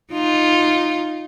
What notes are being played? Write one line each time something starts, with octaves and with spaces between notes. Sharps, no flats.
D#4 F4